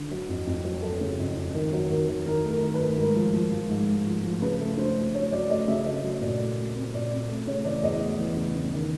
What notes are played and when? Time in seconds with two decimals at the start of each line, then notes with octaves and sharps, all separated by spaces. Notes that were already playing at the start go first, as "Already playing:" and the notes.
Already playing: D3
0.11 F#3
0.29 F2
0.47 F2
0.64 F#3
0.82 F#3 A4
1.01 C#3
1.19 F2
1.36 F2
1.54 D#3
1.73 F#3
1.90 D#3
2.09 D#3
2.26 D#3 A#4
2.44 A3
2.50 A#4
2.62 D#3
2.74 B4
2.80 D#3
2.98 G#2 A#4
3.16 F3
3.33 F3
3.52 F3
3.70 G#2
3.88 A3
4.06 F3
4.24 F3
4.42 C#3 B4
4.60 A3
4.78 D4 C5
4.96 A3
5.14 D4 C#5
5.32 F#3 D5
5.49 A3 D#5
5.68 C#3 E5
5.86 A3 D#5
6.03 F#3
6.21 A#2 D5
6.39 A3
6.57 A3
6.76 C4
6.93 A#2 D5
7.12 C4
7.29 A3
7.47 C#3 C#5
7.65 E3 D5
7.83 E2 D#5
8.01 A3
8.19 E3
8.36 C#3
8.55 C#3
8.73 D#3